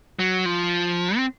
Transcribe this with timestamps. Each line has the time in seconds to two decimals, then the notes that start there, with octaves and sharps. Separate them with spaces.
0.19 F#3
0.46 F3
1.17 C4